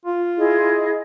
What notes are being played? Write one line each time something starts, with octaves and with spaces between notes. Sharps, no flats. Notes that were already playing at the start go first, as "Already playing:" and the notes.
F4
E4 G#4 D#5